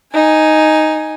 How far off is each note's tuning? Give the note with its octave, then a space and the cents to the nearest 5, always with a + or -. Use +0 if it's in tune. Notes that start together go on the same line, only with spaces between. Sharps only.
D#4 +0 G#5 +0